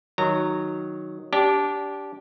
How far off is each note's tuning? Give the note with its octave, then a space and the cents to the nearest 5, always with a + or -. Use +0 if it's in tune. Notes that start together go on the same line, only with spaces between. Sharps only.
D#3 +0 F#3 +0 A#5 -20
D4 -20 G4 -5